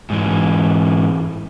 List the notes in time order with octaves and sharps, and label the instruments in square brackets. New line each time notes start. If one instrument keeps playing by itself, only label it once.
[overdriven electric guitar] G#2 E3